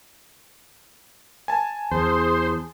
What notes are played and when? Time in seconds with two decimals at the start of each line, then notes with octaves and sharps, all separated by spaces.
1.48 G#5 A5
1.91 E2 G#4 C5